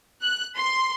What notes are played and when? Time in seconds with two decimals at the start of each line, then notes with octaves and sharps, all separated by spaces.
0.22 F#6
0.56 C6